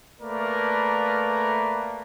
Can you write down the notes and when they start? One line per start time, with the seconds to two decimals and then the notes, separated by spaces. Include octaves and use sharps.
0.20 A3 A#3 A#4 B4 D5